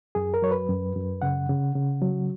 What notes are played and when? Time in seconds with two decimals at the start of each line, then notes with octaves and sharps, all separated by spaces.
0.15 F#2 G#4
0.34 A#4
0.42 F#3 C#5
0.51 B4
0.69 F#2
0.96 F#2
1.22 C#3 F#5
1.49 C#3
1.75 C#3
2.02 F#3